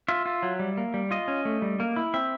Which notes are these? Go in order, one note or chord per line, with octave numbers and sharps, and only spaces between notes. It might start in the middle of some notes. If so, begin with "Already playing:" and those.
F4 E5
F4
F#3
G3
A#3
G3
F4 D#5
C#4
A3
G3
A#3
E4
C4 E5